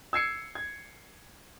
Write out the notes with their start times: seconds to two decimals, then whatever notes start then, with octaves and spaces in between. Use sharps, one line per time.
0.13 E6 G#6 C7 C#7
0.55 G#6